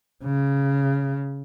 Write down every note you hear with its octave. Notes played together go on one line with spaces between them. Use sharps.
C#3